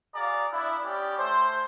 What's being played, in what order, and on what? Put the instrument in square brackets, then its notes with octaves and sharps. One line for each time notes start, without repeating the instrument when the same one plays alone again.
[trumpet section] F#4 G#4 D5 F5 A#5
B3 D4 E4
B3 C#4 G4 D5
A3 C5